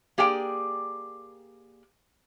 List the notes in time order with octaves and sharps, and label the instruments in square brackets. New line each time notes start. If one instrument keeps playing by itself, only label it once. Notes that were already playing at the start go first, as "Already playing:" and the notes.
[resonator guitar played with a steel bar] A#3 G4 G#4 D5 G5